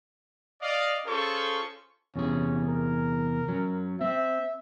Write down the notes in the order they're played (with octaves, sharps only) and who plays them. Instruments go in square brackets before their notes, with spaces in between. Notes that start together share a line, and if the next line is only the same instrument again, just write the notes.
[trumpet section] D5 D#5 F5
C#4 F4 G#4 A4 C5 C#6
[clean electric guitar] E2 C3 G#4 [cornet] C#4
[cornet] A#4
[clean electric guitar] F#3 C#4
[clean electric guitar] C4 [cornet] E5